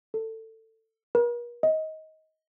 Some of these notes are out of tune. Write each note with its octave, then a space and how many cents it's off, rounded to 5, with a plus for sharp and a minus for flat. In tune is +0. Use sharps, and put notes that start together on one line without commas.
A4 +20
A#4 +45
D#5 +20